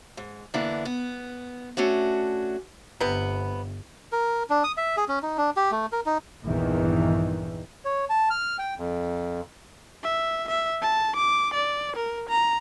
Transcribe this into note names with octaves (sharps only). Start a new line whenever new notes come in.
G#2
D3 E3 A#3 B3 D4 E4
B3
A3 C#4 D4 F#4
G1 C3 B3
A#4
D4
D#6
E5
G#4
C#4
D#4
D4
G4
A3
A#4
D#4
A#1 E2 G2 D#3 E3
C#5
A5
F6
G5
F2
E5
E5
A5
D6
D5
A#4
A#5